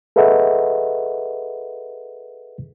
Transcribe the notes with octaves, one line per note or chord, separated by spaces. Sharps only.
G#4 A4 B4 D#5 E5 F#5